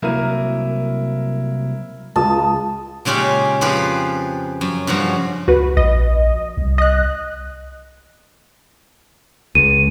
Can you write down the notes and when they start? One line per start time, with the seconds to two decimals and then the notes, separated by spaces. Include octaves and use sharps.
0.03 C2 F#3 A#3 E4 A#4 D#7
2.16 C#2 A5 D#6
3.05 A#2 C#3 G#3 C#4 G4
3.61 F2 F3 F4 G4 G#4 B4
4.61 F#2
4.87 G2 C#3 F3 F#4
5.48 C#2 F#4 B4
5.77 A#1 D#5
6.57 C2
6.78 D#5 F#6
9.55 C#2 D#7